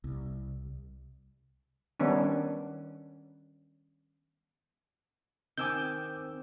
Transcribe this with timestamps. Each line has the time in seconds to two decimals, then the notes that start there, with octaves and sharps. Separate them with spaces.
0.04 C2
2.00 D#3 G3 B3 C#4 D4
5.58 D#3 C4 G#5 D6 E6 G6